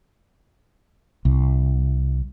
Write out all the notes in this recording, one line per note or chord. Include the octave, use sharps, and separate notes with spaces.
C2